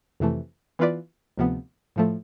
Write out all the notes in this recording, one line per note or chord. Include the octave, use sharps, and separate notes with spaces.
F2 C3 E3 A3
E3 B3 F4 B4 D5
D2 C3 F3 B3
A2 F3 A3